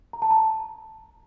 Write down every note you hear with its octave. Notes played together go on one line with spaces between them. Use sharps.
A#5
A5
A#5